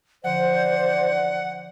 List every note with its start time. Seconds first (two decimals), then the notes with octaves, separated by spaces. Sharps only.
0.24 D3 E3 F3 D4 C5 D5 F#5